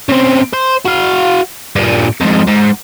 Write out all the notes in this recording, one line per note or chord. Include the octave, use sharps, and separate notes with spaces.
C#3 C4
C5
F#4 F5
G2 A#2
F2 G#2
G#2